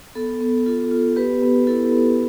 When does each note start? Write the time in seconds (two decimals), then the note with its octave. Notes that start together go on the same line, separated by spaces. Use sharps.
0.15 B3 A4
0.41 B3
0.66 F4 A4
0.91 F4
1.16 B3 G4 B4
1.42 B3
1.67 E4 A4
1.92 B3